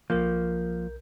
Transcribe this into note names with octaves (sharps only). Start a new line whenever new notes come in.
B1 F3 A#3 A#4 G6